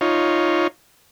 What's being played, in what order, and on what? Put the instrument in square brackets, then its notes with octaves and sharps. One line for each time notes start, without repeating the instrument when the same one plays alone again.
[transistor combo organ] D#4 F4 C#5